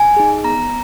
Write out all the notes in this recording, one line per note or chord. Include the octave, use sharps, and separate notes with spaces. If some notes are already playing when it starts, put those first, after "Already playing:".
Already playing: G#5
D#4 G#4
B3 A#5